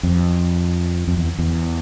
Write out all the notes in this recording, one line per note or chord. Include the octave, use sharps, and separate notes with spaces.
F2
F2
E2
E2